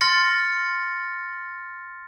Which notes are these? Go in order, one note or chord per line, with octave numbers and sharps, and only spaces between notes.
C6 F6 A6 A#6 C#7